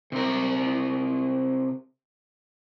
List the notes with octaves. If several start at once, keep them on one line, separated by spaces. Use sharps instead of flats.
C3 A#4